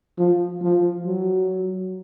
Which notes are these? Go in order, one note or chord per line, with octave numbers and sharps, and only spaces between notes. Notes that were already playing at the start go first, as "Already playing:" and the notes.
F3
F3
F#3